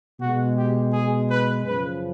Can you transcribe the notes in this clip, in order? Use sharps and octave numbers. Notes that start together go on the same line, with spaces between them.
B2 G#3 F#4
G4
G#4
B4
F#2 C#3 F3 B4